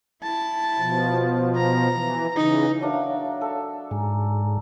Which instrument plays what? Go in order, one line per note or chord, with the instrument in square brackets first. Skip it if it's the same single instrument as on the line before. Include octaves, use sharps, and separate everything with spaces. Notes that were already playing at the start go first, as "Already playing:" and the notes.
[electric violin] E4 A5
[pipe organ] B2 F3
[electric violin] A#5
[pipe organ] E3
[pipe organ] C#3 E3 [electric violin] D#4
[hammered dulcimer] F#3 D4 A#4 [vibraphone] C#5 E5 F5
[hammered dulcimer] A4
[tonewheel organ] G#2 [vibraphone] G#5 A#5